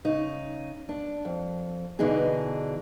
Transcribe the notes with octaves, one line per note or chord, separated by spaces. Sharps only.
C#3 D#4
D4
F2
B2 D3 E3 D4 D#4 G#4